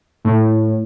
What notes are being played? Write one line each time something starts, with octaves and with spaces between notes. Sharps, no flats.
A2